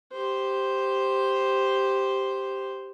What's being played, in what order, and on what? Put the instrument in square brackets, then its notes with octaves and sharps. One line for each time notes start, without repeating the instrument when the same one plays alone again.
[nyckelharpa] G4 C5